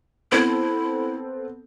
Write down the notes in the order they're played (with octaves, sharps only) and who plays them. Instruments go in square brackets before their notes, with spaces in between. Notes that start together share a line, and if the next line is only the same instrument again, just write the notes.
[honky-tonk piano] B3 C4 A4 [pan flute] E4